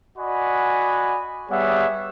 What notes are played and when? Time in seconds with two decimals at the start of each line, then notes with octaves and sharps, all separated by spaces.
0.18 F#4 D5 D#5 F#5 G#5 B5
1.50 G3 B3 G#4 C#5 E5 F#5